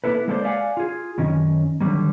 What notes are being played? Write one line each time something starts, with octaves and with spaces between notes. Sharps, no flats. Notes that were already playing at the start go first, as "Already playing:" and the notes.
A#3 B3 E4 A4 B4
G#3 A#3 A4 A#4 C5 D5
G4 A#4 D5 F5 F#5 G#5
F4 G#4
F#2 D#3 C#4 D#5
D3 D#3 F#3 G3 A#3